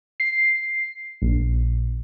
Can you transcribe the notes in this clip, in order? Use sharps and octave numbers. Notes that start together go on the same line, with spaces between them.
C7
A#1